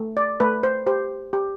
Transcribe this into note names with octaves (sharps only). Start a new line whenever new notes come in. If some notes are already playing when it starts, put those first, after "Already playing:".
Already playing: A3
D5
A3 B4
C5
G4 C5
G4